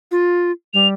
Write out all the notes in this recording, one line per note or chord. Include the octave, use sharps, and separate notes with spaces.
F4
G3 F7